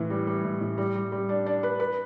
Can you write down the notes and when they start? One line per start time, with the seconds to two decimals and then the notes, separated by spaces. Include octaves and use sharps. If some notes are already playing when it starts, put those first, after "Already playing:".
Already playing: A2 E3
0.10 G3
0.27 G3
0.45 A2
0.61 A2
0.78 G3
0.95 G3
1.12 G3
1.29 D4
1.46 D4
1.63 B4
1.80 B4